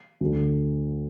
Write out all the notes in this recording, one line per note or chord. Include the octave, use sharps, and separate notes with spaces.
D2 D3